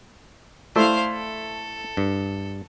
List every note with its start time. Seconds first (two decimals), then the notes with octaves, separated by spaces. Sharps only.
0.76 A3 E4 C5 D5 F5
1.12 A4
1.97 G2